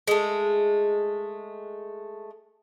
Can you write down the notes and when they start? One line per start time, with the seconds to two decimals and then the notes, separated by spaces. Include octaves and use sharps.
0.08 G#3 A3